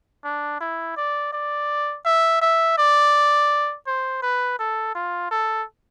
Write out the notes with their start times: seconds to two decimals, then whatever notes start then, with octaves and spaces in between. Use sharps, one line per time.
0.24 D4
0.60 E4
0.97 D5
1.32 D5
2.05 E5
2.41 E5
2.78 D5
3.87 C5
4.22 B4
4.59 A4
4.95 F4
5.31 A4